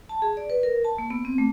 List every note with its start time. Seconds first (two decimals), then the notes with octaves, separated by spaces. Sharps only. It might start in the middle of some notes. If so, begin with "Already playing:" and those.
0.09 A5
0.22 G#4
0.37 D5
0.50 B4
0.63 A#4
0.85 A5
0.98 A#3
1.10 B3
1.25 C4
1.38 A3